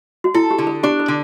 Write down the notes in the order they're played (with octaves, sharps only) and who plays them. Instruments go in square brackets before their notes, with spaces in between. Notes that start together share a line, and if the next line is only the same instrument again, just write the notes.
[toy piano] F#4
[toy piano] E4 [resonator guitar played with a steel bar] A4
[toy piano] G4
[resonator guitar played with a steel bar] D3
[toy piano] A4
[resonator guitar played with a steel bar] D4 [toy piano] G4
[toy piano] A4
[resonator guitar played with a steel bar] D3